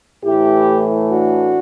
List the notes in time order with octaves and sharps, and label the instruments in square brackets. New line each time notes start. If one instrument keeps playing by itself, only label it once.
[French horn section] A2 E3 A3 E4 G4
D4 F#4